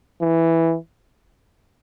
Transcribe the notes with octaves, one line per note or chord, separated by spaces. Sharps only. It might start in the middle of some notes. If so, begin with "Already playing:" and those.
E3